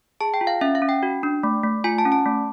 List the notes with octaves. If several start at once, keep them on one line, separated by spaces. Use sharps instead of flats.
G#4 A5
G5
F4
F5
C#4 E5
F5
C#4
G5
F#4
D4
A3
A3
F4 G#5
A5
C#4
A5
A3